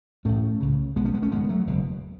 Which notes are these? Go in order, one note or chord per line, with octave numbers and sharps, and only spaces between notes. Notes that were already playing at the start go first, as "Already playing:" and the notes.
A1 A2 A3 C#4
C#2 C#3
B1 B2 G#3 B3
A3 C#4
G#3 B3
A3 C#4
G#1 F#2 C#3 G#3 B3
F#3 A3
F#1 E2 B2